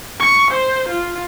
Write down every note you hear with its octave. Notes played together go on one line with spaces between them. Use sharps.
C#6
C5
F4